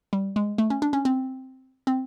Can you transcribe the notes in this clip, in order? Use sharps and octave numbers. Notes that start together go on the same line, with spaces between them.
G3
G#3
A3
C#4
D4
C#4
C4
C4